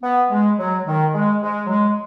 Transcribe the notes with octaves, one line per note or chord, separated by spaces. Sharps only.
B3
G#3
F#3
D#3
G#3
G#3
F#3
G#3